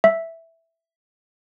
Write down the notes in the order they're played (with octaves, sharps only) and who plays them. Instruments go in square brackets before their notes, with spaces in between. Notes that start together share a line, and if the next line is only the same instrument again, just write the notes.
[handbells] E5